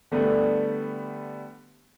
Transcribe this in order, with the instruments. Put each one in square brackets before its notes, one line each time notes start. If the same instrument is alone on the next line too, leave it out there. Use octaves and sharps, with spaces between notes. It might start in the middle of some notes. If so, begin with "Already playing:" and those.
[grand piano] D3 G3 A3 B3 D4